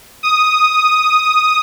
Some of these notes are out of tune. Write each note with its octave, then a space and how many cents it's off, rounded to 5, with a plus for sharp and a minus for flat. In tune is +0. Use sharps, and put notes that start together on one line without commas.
D#6 +0